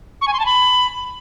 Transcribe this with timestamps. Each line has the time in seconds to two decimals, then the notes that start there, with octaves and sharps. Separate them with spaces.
0.21 C#6
0.27 G#5
0.33 C6
0.40 A5
0.46 B5